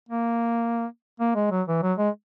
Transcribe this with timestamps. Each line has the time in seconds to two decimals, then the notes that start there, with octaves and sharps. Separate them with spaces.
0.09 A#3
1.20 A#3
1.35 G#3
1.51 F#3
1.68 E3
1.82 F#3
1.98 G#3